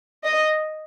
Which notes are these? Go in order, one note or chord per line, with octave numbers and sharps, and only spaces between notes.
D#5